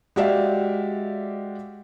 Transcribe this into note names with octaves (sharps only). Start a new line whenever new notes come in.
G#3 F#4 G4 D5 E5 F5